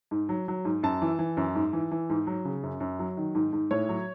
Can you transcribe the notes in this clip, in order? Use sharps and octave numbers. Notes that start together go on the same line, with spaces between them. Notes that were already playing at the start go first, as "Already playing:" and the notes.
G#2
F#3
F#3
G#2
F#2 A5
E3
E3
F#2
G#2
E3
E3
G#2
F#3
C#3
F#2
F#2
F#3
D#3
G#2
G#2
A2 C#5
F#3